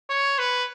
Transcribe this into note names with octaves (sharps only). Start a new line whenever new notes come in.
C#5
B4